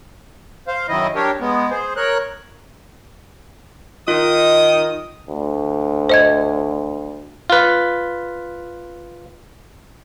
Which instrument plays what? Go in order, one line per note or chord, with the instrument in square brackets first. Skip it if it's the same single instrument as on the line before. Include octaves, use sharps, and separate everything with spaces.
[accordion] C5 F5
F#2 D#3 E4 D#5
D4 G4 A#4 C#5
G#3 B3
G#4 C5
A#4 C#5 F#6
[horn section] D#3 [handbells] F4 [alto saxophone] D#5 [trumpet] D#6
[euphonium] D2
[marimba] C5 D#5 G#6
[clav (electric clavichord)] F4 B4